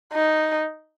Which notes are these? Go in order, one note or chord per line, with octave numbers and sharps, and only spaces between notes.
D#4